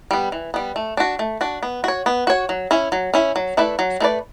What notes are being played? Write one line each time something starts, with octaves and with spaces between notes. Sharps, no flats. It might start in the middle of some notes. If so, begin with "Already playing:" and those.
G3 B3
E3
G3 B3
A3
D4 F#4
A3
D4 F#4
B3
F#4 C#5
B3
F#4 C#5
F#3
C#4 E4
F#3
C#4 E4
F#3
A3 E4 B4 D5
F#3
A3 E4 B4 D5